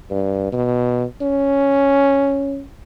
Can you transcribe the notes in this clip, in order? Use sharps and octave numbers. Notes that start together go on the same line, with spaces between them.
G2
B2
C#4